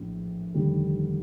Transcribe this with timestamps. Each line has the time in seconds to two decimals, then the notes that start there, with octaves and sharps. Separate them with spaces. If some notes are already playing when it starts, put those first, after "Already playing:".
Already playing: A#1 A2 E3
0.54 F1 D#2 D3 G3